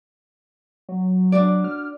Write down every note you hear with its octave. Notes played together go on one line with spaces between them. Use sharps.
F#3
D4 F#4 D5
F6